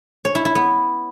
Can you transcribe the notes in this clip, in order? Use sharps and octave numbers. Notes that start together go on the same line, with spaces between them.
C#5
E4
E4
B3